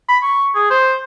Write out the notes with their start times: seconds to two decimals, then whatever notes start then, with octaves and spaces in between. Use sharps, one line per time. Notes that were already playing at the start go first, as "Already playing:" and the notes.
0.09 B5
0.23 C#6
0.55 G#4
0.70 C5